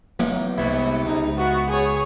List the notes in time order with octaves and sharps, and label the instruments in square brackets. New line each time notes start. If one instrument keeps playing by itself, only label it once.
[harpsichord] A1 D#4 D6 [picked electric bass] F#3 A#3 B3
[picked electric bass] C2 B3 [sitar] G#2 G3 [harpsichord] E4
[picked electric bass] C#2 [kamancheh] D#4
[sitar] B3 [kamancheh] F#4
[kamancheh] G#4 C#5